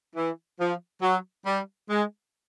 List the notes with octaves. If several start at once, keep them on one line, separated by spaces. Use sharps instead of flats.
E3
F3
F#3
G3
G#3